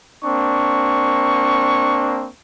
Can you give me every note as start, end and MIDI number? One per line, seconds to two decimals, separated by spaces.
0.24 2.30 58
0.24 2.30 60
0.24 2.30 62
0.24 2.30 85